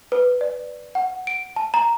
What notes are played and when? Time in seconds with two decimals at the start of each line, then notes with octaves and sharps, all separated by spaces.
0.12 B4
0.41 D5
0.95 F#5
1.27 D7
1.56 A5
1.74 A#5